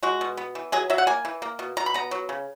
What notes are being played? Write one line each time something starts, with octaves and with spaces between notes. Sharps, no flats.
G#3 F#4
B2
B3
E3
F#3 G#4
F#3 E5
F#5
A#3 G#5
E3
A#3
B2
B2 A#5
B5
B3 A#5
F#3
C#3